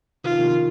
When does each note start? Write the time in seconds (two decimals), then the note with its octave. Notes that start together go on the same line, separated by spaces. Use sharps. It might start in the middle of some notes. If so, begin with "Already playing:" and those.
0.24 D#3 F4
0.31 F3
0.39 C3 D#3